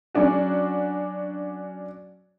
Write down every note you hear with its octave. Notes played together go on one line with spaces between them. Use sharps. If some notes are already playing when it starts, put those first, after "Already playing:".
F#3 C#4 D4 F#4